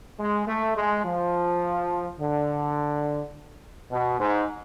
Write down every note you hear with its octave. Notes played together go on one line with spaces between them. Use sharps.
G#3
A3
G#3
F3
D3
B2
G#2